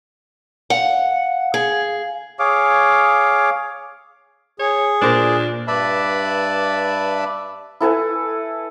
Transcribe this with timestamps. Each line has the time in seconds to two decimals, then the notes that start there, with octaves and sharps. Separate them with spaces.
0.70 F5 F#5
1.54 G#4
2.39 G#4 C#5 F5 D6
4.59 G#4 C#5
5.02 A#2 D4 A#4 C5 D5
5.68 G2 B4 D5 E5 A5 B5
7.81 E4 A4 B4 G#5